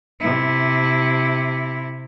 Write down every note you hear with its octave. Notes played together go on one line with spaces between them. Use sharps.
C3 E4